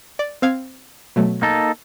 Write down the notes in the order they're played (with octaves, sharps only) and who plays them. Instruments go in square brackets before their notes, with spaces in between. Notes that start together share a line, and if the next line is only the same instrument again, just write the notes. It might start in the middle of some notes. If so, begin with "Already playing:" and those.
[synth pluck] D5
C4 F5 G#6
B2 F#3 A3
[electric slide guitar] A#3 D#4 A4